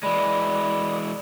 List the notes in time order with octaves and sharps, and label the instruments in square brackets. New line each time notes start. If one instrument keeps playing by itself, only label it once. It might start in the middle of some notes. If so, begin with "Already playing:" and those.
[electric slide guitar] E3 G#3 [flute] D5 [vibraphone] B5